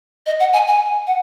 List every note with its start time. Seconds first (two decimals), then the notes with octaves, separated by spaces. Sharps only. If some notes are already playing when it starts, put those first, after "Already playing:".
0.26 D#5
0.40 F#5
0.53 G#5
0.67 G#5
1.07 F#5